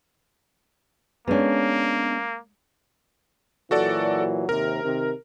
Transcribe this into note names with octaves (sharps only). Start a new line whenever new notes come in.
G#3 A#3 B3 C#4 D4
A#2 E3 F#3 F#4 A4 D5
D#2 C3 A#4
C3 D#3